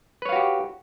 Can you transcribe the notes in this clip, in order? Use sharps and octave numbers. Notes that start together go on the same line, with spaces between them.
F#4 G4 B4 C#5 F5